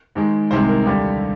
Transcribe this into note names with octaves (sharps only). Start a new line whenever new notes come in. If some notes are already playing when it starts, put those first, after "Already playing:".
G#2 D#3 G#3
C2 C3 D#3 G#3 C5
A#4
D#2 D3 G3 G4